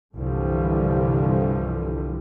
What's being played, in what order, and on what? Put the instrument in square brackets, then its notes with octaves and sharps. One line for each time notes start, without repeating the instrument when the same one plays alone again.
[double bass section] C2 G2 D3 E3 F3 G3